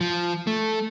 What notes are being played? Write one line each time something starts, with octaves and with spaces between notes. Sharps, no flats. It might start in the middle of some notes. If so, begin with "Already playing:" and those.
F3
A3